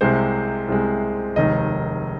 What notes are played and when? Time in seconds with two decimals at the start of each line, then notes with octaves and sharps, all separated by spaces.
0.01 C2 C3 G#3 C5
0.68 C2 C3 G#3
1.36 F1 D#2 D#3 G#3 D#5